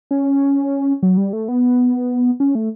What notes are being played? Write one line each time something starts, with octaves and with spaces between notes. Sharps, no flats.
C#4
F#3
G3
A3
B3
C#4
A3